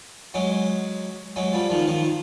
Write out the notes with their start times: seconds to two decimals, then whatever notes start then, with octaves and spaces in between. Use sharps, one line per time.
0.34 F#3 G#3
1.36 F#3 G#3
1.53 F3 G3
1.70 D#3 F3
1.88 D#3 F3